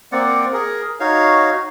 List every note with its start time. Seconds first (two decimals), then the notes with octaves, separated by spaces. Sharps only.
0.12 A#3 C4 D5 F#5
0.53 G#4 A#4
1.00 D#4 F#4 C#5 F5